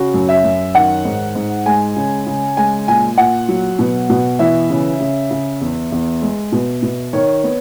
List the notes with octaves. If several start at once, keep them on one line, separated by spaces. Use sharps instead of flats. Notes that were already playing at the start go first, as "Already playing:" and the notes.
Already playing: C#3 F#4
F#2
E5
F#2
D#3 F#5
G#2
G#2
G#3 G#5
C#3
C#3
G#3 G#5
A#2 G#5
A#2 F#5
F#3
B2
B2
E3 E5
C#3
C#3
C#3
E2
E2
G#3
B2
B2
D#3 C#5
B3